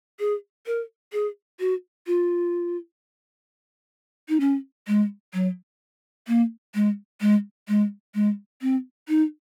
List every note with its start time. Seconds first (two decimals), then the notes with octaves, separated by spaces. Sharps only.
0.19 G#4
0.67 A#4
1.13 G#4
1.60 F#4
2.07 F4
4.29 D#4
4.40 C#4
4.87 G#3
5.33 F#3
6.28 A#3
6.75 G#3
7.21 G#3
7.68 G#3
8.15 G#3
8.62 C4
9.08 D#4